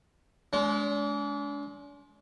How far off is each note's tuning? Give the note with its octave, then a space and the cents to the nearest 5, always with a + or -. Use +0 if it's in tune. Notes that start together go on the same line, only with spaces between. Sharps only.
G#3 +30 D4 -40